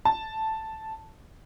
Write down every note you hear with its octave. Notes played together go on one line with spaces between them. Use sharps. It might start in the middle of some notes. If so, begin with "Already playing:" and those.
A5